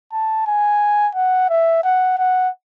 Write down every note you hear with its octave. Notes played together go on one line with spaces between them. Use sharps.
A5
G#5
F#5
E5
F#5
F#5